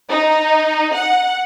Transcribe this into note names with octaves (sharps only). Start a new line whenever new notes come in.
D#4
F#5